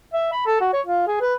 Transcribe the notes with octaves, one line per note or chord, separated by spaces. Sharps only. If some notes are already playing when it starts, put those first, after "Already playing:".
E5
B5
A4
F#4
C#5
F4
G#4
B4